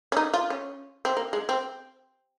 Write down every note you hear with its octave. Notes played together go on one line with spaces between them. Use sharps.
C#4
D#4
F4
C#4
C4
A#3
G#3
C4